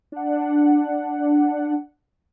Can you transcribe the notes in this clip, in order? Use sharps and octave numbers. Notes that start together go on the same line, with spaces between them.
D4 F#5